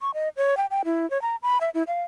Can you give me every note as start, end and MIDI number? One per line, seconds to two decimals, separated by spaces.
0.01 0.11 85
0.14 0.29 75
0.37 0.57 73
0.57 0.66 79
0.71 0.82 79
0.85 1.08 64
1.10 1.21 73
1.22 1.36 82
1.43 1.58 83
1.61 1.70 76
1.74 1.83 64
1.87 2.03 77